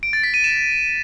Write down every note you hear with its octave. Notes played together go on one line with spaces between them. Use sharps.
D7
A6
B6
D#7
E7